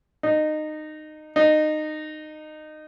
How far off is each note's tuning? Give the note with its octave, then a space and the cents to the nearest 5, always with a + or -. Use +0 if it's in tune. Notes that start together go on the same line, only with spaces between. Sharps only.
D#4 -20
D#4 -20